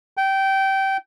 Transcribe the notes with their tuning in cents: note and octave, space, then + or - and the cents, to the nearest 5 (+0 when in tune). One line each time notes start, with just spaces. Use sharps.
G5 -20